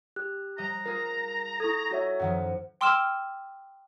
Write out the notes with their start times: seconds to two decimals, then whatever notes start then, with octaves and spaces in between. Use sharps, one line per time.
0.16 G4 F#6
0.58 G3 D#5 A#5
0.86 F4 G#4 A#4
1.60 E4 A4 C#6 D#6 G#6
1.91 F#4 C#5 E5
2.20 F#2 D#3 F3 F#5
2.81 G5 C6 D6 E6 F6 E7